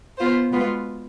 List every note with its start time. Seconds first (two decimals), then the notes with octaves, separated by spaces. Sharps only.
0.18 B3 F4 C5
0.51 B2 G#3 B3 F4 B4